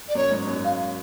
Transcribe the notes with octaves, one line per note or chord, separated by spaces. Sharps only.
D5
F#2 C#5
G#2
F#2
F5